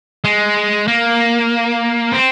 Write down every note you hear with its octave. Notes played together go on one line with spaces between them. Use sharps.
G#3
A#3
C4